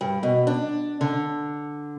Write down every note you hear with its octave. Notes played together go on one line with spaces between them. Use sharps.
G2
B2
D4
D3